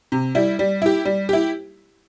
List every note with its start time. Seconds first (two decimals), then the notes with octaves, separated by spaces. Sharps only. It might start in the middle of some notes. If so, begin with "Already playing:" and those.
0.12 C3
0.35 G3 E4
0.59 G3
0.82 E4 G4
1.05 G3
1.29 E4 G4